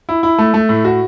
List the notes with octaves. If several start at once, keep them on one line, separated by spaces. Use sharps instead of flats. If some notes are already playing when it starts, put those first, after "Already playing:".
E4
E4
A3
A3
A2
F#4